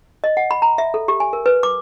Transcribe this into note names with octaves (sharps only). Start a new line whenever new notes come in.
D#5
F#5
B5
A#5
E5
A4
G4
G#5
A#4
B4
D6